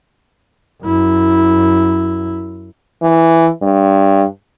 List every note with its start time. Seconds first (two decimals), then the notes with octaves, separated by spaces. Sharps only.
0.82 F#2 E4
3.02 E3
3.62 G2